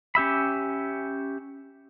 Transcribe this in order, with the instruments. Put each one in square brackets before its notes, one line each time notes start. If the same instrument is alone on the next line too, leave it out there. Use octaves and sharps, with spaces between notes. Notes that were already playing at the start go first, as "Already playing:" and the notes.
[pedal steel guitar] C#4 G4 E5 B5